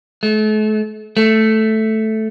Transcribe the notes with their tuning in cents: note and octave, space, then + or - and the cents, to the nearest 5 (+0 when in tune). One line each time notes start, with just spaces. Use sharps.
A3 -40
A3 -5